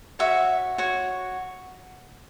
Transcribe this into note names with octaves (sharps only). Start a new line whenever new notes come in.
F#4 C#5 E5
F#4 C#5